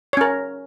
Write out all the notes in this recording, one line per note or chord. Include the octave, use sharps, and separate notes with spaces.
C#4 A#4 C#5